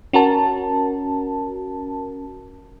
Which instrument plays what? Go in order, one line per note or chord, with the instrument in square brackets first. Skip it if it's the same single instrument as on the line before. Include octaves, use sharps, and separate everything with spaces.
[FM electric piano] C#4 F#4 A#4 A5